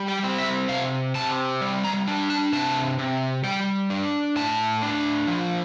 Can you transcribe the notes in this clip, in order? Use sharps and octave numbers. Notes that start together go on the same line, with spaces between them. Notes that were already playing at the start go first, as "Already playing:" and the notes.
Already playing: G3
G4
C4
E5
C3 F5
C3 A5
G3
A#5
D4
A5
C3 A5
C3
G3 G5
D4
A2 A5
D4
F3